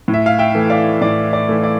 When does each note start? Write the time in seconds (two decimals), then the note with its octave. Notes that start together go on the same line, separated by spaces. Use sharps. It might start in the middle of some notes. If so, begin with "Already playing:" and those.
0.08 A2
0.14 E5
0.26 F5
0.39 E5 G5
0.55 E3 A3
0.70 D5 F5
1.01 A2 D5
1.33 D5
1.49 E3 A3
1.64 D5